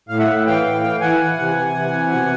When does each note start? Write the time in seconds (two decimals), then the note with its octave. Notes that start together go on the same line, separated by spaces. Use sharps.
0.09 A2 F5
0.19 E5 F#5
0.28 A2
0.46 E3 F5 G5
0.64 A2
0.83 E3
1.01 E3 F#5 G#5
1.19 E3
1.38 C3
1.56 C3
1.75 E3
1.92 C3
2.11 B2